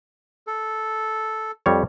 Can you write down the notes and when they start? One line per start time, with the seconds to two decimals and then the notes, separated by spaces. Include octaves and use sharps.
0.47 A4
1.66 F2 G3 C#5